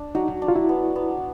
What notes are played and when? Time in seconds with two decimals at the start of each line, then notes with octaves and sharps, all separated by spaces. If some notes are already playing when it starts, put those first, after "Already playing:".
Already playing: D4
0.15 F#3 D#4
0.42 D4
0.48 F4
0.56 E4
0.69 B3
0.96 B3